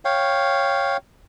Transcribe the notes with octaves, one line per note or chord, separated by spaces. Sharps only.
C#5 F5 G5